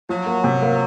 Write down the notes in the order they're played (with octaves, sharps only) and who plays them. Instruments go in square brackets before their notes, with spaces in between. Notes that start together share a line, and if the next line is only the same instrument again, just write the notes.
[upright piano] F3 [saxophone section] F#3
[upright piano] A#3
C3
A#3